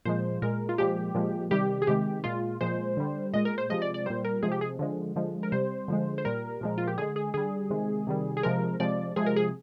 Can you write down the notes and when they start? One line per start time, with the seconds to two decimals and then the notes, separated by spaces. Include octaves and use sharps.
0.05 A#2 F3 G#3 C5
0.42 A#2 G#3 A#4
0.69 F4
0.78 A#2 F3 G#3 G4
1.15 A#2 F3 G#3
1.51 C3 D#3 G3 G4
1.82 G#4
1.87 C3 D#3 G#3 G4
2.24 A#2 G#3 F4
2.61 A#2 F3 G#3 C5
2.97 D3 G3
3.33 A#2 G#3 D#5
3.45 A#4
3.58 C5
3.70 C3 F3 G#3 D#5
3.82 D5
3.94 D5
4.06 A#2 G3 C5
4.25 A#4
4.43 C3 F3 G#3 G#4
4.52 G4
4.61 G#4
4.79 D3 F3 G#3
5.16 D3 F3 G#3
5.43 A#4
5.52 C3 G3 C5
5.88 D3 F3 G#3
6.18 C5
6.25 A#2 G3 A#4
6.61 A#2 F3 G#3
6.78 F4
6.87 G4
6.98 D3 G#3 G#4
7.16 G#4
7.34 D3 G3 G#4
7.70 C3 D#3 G#3
8.07 C3 D#3 G3
8.37 G#4
8.43 C3 F3 G#3 A#4
8.80 C3 F3 G#3 D5
9.16 C3 F3 G#3 G#4
9.26 A#4
9.36 G#4